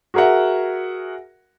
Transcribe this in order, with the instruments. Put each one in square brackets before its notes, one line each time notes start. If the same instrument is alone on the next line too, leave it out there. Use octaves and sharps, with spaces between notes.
[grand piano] F#4 G#4 A#4 E5 F#5